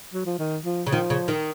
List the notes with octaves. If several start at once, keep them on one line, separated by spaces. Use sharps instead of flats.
F#3
F3
D#3
F3
C#3
D#3 F3
C#3
D#3